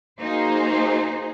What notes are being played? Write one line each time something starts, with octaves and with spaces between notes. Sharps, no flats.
A#3 D#4 F#4 G#4 C5